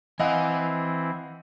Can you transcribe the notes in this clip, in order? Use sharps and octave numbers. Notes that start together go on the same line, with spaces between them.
E3 C4 E4 D#5 F5 F#5 G#5